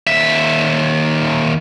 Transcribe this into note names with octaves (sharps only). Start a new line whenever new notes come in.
D#2 E5